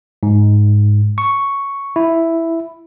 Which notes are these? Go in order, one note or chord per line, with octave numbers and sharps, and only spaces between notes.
G#2
C#6
E4